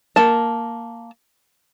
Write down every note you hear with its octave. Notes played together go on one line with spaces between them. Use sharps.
A#3 A5